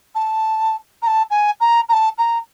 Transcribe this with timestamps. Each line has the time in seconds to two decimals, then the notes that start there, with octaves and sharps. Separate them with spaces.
0.15 A5
1.02 A#5
1.07 A5
1.31 G#5
1.60 A#5
1.89 A#5
1.93 A5
2.18 A#5